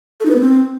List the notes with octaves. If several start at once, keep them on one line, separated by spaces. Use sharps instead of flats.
A4
D#4
B4
B3
C4